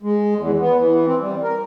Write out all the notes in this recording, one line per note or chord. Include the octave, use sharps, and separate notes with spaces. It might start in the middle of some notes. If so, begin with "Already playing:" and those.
G#3
E2
B3
E3
C4
G3
A#4